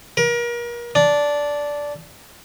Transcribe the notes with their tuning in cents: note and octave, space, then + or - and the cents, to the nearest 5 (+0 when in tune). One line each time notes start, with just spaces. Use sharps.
A#4 +35
D4 -10